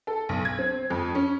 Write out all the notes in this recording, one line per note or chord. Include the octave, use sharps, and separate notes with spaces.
A4
B1
G#6
C4
F2
C#4